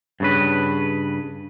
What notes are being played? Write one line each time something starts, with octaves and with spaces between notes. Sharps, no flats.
G2 C#3 B4